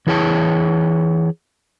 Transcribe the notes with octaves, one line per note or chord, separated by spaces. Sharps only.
E3 E4 G#4 C#5 A5